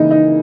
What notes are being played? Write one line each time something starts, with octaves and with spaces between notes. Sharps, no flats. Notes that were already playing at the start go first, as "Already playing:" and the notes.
Already playing: C#3 E3 A#3 D#4
D#4